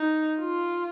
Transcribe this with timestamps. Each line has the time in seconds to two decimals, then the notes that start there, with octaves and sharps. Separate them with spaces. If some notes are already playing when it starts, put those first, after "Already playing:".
Already playing: D#4
0.40 F4